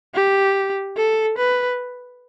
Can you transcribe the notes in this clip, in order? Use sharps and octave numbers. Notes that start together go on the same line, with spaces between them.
G4
A4
B4